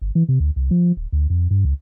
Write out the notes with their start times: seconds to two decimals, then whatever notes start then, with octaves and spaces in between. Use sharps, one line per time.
0.01 G1
0.15 E3
0.29 C3
0.40 D2
0.56 C2
0.71 F3
0.97 D1
1.12 D2
1.30 F2
1.51 G2
1.65 C#2